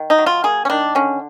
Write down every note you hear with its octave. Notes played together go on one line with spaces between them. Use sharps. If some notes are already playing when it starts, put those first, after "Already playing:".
Already playing: D#3
D#4
F#3
F4
A#3 G#4
C#4
D#3 D4
D3 C#4